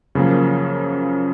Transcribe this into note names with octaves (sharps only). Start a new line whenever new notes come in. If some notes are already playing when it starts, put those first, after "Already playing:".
F#2 C#3 F3 A#3 C#4